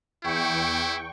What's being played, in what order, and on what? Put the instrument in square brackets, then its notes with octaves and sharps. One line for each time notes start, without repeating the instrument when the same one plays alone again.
[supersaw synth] E2 G5 C#6 [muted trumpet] E4